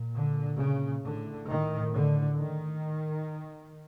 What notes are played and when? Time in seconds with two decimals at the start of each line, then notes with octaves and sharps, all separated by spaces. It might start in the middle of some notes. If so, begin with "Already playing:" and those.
Already playing: A#2
0.15 D3
0.60 C#3
1.03 A2 D3
1.48 D#3
1.93 D3
2.36 D#3